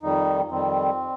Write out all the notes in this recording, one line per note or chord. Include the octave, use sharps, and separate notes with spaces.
F2 D#3 G3 D#4
F2 D#3 G3 C4